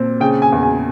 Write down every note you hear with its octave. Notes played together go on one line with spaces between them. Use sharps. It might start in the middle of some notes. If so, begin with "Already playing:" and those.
Already playing: A#2 C4
C#3 G5
G#5
E2
G#5